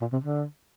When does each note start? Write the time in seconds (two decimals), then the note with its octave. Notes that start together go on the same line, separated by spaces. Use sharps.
0.01 A#2
0.12 C3
0.24 D3